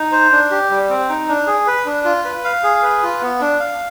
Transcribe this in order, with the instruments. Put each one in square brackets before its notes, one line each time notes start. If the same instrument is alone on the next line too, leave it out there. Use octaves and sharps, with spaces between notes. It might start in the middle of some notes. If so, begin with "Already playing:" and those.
Already playing: [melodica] D#4
C5
D4
G4
G3
C4
D#4
D4
G#4
B4
D4
F4
B4
F5
G#4
B4
F4
B3
D4
F5